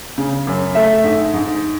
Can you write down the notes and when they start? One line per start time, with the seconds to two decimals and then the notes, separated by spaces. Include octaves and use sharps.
0.18 C#3
0.47 F#2
0.75 A3 E5
1.04 G#2
1.33 G#2